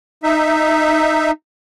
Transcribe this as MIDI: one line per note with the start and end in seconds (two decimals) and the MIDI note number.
0.23 1.31 63
0.23 1.31 76